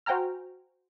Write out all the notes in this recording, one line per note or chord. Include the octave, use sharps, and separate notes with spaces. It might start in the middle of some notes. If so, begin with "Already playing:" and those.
F#4 C5 G5 G#5 A#5 F6